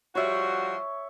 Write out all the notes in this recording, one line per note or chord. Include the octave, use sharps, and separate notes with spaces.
F3 G3 F#4 C#5 E5